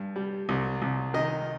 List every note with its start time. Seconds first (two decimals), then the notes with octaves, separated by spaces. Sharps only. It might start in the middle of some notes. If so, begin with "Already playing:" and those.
Already playing: G2
0.16 G3
0.49 C2
0.82 C2
1.14 D#3 D#5